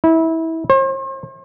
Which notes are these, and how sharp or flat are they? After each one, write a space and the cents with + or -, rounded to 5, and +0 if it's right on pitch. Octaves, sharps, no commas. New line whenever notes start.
E4 -25
C5 +45